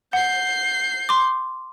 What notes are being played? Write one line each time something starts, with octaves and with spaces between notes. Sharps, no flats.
F#5 G6 C7
C6 D6